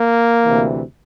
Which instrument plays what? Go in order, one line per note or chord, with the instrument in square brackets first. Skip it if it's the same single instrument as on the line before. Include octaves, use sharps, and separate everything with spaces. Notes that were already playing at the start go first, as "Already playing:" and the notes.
Already playing: [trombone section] A#3
D2 C3 E3